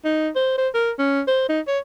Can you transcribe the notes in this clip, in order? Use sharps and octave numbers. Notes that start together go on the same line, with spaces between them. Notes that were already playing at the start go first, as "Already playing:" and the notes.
D#4
C5
C5
A#4
C#4
C5
D#4
C#5